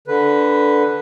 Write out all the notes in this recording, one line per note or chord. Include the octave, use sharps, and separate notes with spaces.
D3 B4